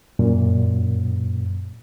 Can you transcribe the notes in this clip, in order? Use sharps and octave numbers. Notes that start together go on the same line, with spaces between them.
F#2 A#2